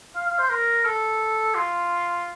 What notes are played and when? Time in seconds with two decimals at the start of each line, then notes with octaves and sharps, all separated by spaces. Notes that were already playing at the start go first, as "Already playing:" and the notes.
0.16 F5
0.27 F5
0.39 C5
0.50 A#4
0.85 A4
1.55 F4